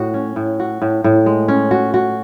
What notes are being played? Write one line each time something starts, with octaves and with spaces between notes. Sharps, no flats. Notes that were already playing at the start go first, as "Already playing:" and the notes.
Already playing: A2 F#4
C#4
A2
F#4
A2
A2
G#3
C#4
F#4
F#4